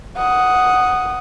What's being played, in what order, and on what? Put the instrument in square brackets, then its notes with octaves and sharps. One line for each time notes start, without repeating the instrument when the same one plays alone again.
[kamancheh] F#5 D#6